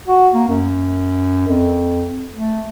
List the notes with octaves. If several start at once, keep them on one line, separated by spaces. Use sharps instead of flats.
F#4
A#3
F#2
F2
A3